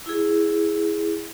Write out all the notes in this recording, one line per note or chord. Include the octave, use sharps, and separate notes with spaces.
E4 G#4